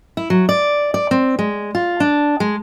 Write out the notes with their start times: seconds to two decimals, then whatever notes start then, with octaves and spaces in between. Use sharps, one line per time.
0.17 E4
0.30 F#3
0.49 D5
0.94 D5
1.11 C4
1.39 G#3
1.75 F4
2.00 D4
2.40 G#3